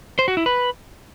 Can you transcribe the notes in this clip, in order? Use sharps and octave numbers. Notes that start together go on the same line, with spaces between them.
C5
F#4
E4
B4